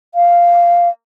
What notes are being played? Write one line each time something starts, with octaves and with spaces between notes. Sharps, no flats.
F5